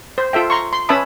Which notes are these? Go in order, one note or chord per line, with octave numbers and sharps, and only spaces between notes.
C5
F4 A4 E5 G5
A#5 C6 C#6
C6
C#4 B4 E5 A5 B5 D#6